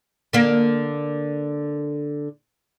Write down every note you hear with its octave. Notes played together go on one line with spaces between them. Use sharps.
D3 A#3